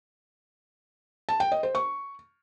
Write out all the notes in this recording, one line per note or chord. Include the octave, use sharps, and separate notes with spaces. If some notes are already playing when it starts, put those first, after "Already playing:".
A5
G5
D#5
C5
C#6